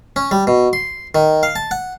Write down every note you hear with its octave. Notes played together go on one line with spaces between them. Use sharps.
C#4
G3
B2
C6
D#3
F5
A5
F#5